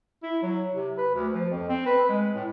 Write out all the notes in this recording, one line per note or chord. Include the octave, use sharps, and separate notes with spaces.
E4
F#3
C3
B4
D2
F3
F2
C4
B4
G#3
A2